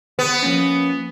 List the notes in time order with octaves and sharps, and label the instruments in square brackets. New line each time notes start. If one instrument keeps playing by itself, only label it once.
[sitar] B3
[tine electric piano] F3 A#3 C#4